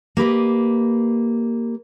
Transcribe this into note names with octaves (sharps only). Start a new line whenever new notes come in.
A#3 G4 B4 D#5